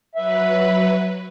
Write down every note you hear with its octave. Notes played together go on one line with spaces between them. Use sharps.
F#3 B4 E5